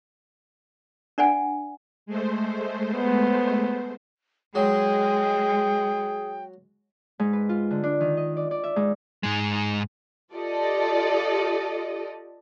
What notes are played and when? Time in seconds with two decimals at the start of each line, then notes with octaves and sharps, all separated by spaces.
1.18 D4 D5 F#5 G#5
2.06 G#3 A3 C5
2.95 B3
4.55 F#3 G#3 G#4 G5
7.19 G#2
7.33 B4
7.49 F4
7.71 D3
7.83 D4
8.01 D#3
8.17 D#5
8.37 D5
8.51 D5
8.64 E5
8.76 G#2
9.23 G#2 G#3
10.33 F4 G4 A4 D5 D#5